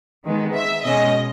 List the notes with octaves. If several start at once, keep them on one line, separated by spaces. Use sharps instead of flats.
D#3 G#3 B3
E5
B2 G#3 C#4 D#5